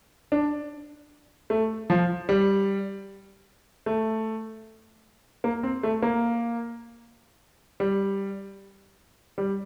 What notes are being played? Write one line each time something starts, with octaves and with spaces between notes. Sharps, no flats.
D4
A3
F3
G3
A3
A#3
C4
A3
A#3
G3
G3